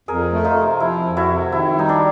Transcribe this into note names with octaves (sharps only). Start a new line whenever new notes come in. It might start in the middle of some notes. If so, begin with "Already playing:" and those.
F2 G#4 A#4
A3
D#4 F4
C3
F3 E4
F2
E4 F#4
C3
D#3 E4
G3 D#4
D4